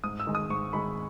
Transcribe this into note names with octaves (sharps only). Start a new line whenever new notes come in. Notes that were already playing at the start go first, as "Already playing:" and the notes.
G#2 D#6
E6
D#3 G#3
D#6
G#2 C#6
D#3 G#3 B5